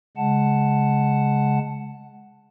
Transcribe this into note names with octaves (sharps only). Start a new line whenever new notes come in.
C#3 G#3 F#5 A5